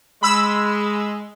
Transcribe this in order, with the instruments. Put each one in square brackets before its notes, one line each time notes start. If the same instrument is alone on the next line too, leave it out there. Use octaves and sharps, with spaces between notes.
[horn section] G#3 [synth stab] B5 E6